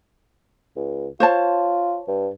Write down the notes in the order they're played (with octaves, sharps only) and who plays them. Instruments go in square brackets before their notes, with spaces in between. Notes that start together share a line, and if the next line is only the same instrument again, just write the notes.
[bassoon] C#2
[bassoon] F4 [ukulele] C5 C#5 A5
[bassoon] G2